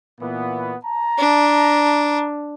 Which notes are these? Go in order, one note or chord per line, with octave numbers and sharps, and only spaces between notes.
A#2 E3 B3
A5 A#5
D4